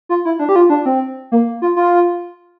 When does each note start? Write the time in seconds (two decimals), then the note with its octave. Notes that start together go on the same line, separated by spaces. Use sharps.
0.09 F4
0.25 E4
0.39 D4
0.49 G4
0.56 F4
0.70 D4
0.86 C4
1.32 A#3
1.62 F4
1.76 F4